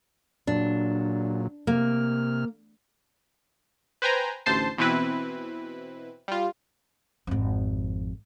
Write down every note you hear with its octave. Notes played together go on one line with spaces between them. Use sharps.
A#2 F#3 D4
C3 A#3 F6
B4 C5 G5 G#5 A#5
A1 D2 C5 A5 C7
B2 E3 C4 E4 B4
G3 F4
G#1 F2